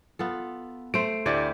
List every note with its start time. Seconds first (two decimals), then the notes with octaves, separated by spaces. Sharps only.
0.19 B3 F4 A4
0.94 A3 C5 D7
1.26 D2 C4 E4 G4 D5